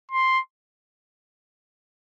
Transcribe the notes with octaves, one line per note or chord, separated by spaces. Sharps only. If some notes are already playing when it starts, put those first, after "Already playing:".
C6